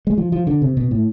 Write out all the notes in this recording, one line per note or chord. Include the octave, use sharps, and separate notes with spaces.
G#3
F3
F3
D3
C3
B2
A2